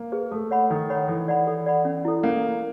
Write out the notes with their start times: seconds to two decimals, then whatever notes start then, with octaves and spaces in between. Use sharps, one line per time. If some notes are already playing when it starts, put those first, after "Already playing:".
Already playing: A#3
0.12 G#4 B4
0.31 A3 A4
0.51 C#5 F#5 B5
0.70 D#3 A4
0.90 C#5 F#5 B5
1.08 E3 A4
1.28 D5 F#5 B5
1.47 A4
1.66 D5 F#5 B5
1.85 C#4
2.05 E4 A4
2.23 A#3 C#4